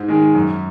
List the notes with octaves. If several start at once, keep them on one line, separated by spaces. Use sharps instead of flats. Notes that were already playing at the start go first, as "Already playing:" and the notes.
Already playing: G#2
D#3 G#3
F#2